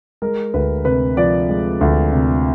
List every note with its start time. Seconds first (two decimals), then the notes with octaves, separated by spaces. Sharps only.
0.22 G#3 A#4
0.54 D2 B4
0.85 C3 B4
1.17 F3 D5
1.49 G#3
1.81 D2
2.13 C3